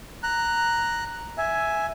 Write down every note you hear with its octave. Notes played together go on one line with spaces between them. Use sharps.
A#5 F#6
E5 G#5